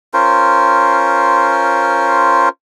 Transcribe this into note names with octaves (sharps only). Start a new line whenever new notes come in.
C#4 F4 A#4 C5